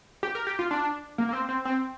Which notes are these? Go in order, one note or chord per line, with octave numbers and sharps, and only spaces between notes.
G4
A#4
G4
F4
D4
A#3
A#3
C4
C4
C4